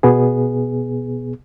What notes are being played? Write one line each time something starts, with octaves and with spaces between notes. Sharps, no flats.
B2 B3 G#4